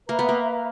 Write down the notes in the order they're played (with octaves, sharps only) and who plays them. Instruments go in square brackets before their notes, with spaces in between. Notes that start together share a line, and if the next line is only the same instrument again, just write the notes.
[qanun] A#3 [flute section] B4 E5 A#5
[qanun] B3
A#3